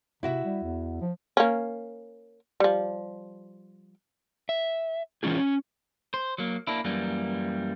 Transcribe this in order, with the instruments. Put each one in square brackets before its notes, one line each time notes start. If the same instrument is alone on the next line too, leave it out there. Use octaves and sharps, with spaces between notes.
[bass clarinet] C3 [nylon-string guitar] E4 F#4 E5
[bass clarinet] G3
E2
F3
[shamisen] A#3 C#4
F3 G3
[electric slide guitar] E5
E3 G#3 C#4 F4 G#4
C#4
[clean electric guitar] C5
F#3 A#3
A#3 D4 E4
F#2 E3 G3 A#3